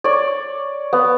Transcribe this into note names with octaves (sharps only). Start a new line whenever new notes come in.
C#5 D5
B3